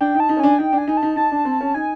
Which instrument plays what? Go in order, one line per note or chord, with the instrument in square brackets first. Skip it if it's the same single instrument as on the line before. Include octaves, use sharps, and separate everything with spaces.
[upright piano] D4 [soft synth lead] G5
[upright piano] D#4
[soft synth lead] A5
[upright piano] D#4
C#4
[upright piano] D4 [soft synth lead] G#5
[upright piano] D#4 [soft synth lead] G5
[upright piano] D4
[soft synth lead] G#5
[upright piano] D#4
[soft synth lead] A5
[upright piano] D#4
[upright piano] D#4 [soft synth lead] A5
[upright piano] D4
C4
C#4
[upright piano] D#4 [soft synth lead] G#5